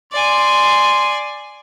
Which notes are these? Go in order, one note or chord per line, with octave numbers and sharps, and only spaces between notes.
D5 G#5 C6